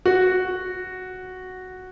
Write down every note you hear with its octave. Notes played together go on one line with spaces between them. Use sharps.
F#4